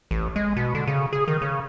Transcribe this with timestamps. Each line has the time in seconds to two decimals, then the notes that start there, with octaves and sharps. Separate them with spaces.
0.11 A1
0.36 G#3
0.56 B2
0.75 D3
0.87 C#3
1.13 G#4
1.28 D#3
1.42 C#3